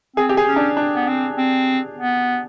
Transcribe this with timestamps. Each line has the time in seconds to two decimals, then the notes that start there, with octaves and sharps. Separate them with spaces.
0.16 C4 G#4
0.29 G4
0.37 G#4
0.47 C#4
0.56 D4
0.77 D4
0.95 B3
1.07 C4
1.38 C4
1.98 B3